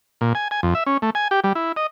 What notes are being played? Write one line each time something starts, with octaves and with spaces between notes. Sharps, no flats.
A#2
G#5
G#5
F2
E5
C#4
A3
G#5
G4
G3
E4
D#5